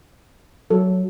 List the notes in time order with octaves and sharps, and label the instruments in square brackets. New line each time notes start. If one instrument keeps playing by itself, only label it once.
[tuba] F#3 [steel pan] A4